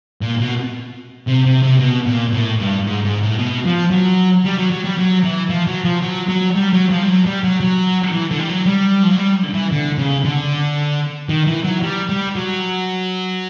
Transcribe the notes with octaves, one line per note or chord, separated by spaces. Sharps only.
A#2
B2
C3
C3
C3
B2
A#2
A2
G2
G#2
G#2
A2
B2
F3
F#3
G3
F#3
F#3
G3
F#3
E3
F3
F#3
F3
F#3
F#3
G3
F#3
F3
G3
F#3
G3
F#3
F#3
E3
D3
G3
F#3
G3
F3
F#3
G3
E3
D3
C#3
D3
D#3
E3
F#3
G3
G3
F#3